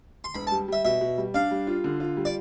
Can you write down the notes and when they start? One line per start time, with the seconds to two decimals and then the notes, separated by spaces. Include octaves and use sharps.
0.24 C6
0.34 E1 B5
0.47 A5
0.51 G3
0.68 G3 E5
0.85 B2 E5
1.01 B2
1.18 G3
1.34 D4 F5
1.51 G3
1.67 F4
1.84 D3
2.00 F4
2.17 G3
2.25 D5